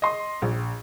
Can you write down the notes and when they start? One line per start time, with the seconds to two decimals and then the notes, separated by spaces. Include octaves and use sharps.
0.02 D#5 C6
0.42 A#1